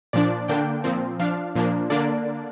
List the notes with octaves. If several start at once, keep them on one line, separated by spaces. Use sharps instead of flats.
A#2 F3 D4 D5
D3 A#3 D4 G5
A#2 F3 C4
F3 D4 F5
A#2 F3 A#3 D4
D3 A#3 D4 D5